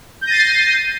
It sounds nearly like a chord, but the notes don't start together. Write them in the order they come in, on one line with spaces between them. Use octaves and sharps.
G6 A#6 D#7 A6 C7